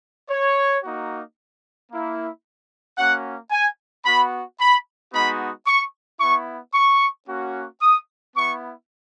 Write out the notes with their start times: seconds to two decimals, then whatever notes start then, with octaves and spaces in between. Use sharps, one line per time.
0.29 C#5
0.83 A#3 D#4 F#4
1.91 A#3 E4
2.97 A#3 C#4 F#4 F#5
3.51 G#5
4.05 B3 F#4 B5
4.60 B5
5.12 G#3 B3 D#4 F#4 B5
5.66 C#6
6.20 B3 E4 C#6
6.74 C#6
7.28 A#3 C#4 F#4
7.81 D#6
8.35 B3 E4 C#6